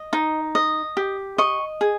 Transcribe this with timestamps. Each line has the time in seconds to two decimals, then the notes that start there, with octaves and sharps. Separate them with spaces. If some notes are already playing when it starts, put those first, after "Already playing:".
Already playing: D#5
0.13 D#4
0.55 D#5
0.97 G4
1.38 D#5 C#6
1.81 G#4